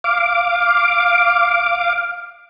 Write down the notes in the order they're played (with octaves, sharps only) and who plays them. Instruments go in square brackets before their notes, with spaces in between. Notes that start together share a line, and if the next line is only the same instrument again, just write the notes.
[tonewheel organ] F5 D6